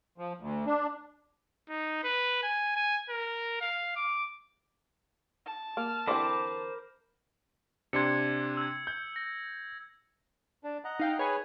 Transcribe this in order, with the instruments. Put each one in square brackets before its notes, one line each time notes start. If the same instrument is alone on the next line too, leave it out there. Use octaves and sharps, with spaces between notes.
[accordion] F3
D2
D4
[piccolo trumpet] D#4
B4
G#5
G#5
A#4
F5
D6
[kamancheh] A5
[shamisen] A#3 [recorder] F6
[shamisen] D3 E3 C4 [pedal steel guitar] A#4 B5 D6 [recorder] C5
[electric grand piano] C3 D4 C6 [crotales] G#6 C#7
[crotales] E6 G#6
[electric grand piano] G6
[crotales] A#6
[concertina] D4
D#5 F#5 A#5
[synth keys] D#4 F5 G5
[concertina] G#4 B4 [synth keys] C#5 G#5